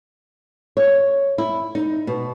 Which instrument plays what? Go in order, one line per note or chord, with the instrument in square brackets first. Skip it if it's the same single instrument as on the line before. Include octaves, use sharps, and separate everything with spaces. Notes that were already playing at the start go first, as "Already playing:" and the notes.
[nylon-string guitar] C#5
E4
D#4
B2